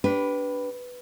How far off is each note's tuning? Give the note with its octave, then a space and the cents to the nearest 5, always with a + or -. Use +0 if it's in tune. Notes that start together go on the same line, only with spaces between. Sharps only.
D4 -20 G4 -10 B4 +0